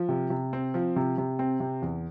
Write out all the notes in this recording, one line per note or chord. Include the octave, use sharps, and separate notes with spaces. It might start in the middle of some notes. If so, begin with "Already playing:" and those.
Already playing: F3
C3
C3
C4
F3
C3
C3
C4
C3
E2